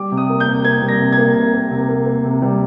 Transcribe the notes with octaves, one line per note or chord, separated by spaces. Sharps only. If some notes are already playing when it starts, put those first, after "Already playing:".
Already playing: G3 D6
C3
D#6
A#3
G6
C3
A#3 G#6
G3
A#6
C3
G#6
A#3
C3
A#3
C3
A#3
A#3
C3
G3